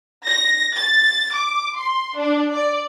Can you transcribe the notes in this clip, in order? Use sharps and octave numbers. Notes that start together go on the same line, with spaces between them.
A#6
A6
D6
C6
D4
D5